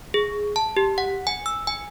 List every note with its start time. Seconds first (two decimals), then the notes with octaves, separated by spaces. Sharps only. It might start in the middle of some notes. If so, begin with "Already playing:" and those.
0.14 G#4
0.56 A5
0.76 G4
0.98 F#5
1.27 G#5
1.46 E6
1.67 G#5